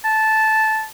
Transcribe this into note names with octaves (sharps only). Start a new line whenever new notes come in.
A5